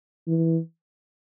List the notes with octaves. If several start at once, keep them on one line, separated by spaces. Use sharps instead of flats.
E3